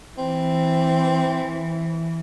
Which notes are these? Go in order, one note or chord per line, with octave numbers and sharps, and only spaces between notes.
E3 C4